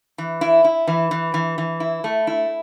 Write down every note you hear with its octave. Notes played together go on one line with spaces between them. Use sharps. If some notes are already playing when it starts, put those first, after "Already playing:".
E3
E4
E4
E3
E3
E3
E3
E4
A3
E4